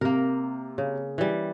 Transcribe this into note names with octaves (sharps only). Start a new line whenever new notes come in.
C3 A#3 A#4
C#3
E3 G3